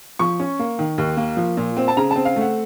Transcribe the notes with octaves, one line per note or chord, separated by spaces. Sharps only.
F3 C#6
C#4
A#3
D#3
D#2
A#3
F3
A#2
C4
A5
C#3 A#5
C4 A5
F5
A3
F#5